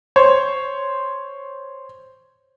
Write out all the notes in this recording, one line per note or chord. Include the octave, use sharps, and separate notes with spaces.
C5 C#5